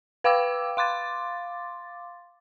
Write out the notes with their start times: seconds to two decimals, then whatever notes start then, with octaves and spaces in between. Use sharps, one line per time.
0.24 B4 F5 G5 D6 E6
0.77 F5 C6 D6 A6